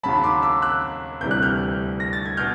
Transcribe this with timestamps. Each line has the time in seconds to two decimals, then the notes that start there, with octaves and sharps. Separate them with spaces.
0.03 D#2 C#3 F#3 A5 B5
0.24 C6 D6
0.42 D6 E6
0.62 E6 F#6
1.21 D2 C3 E3 G3 G6
1.31 F#6
1.42 F6 G6
2.00 A#6
2.13 A6
2.26 G#6
2.37 B2 F6 G6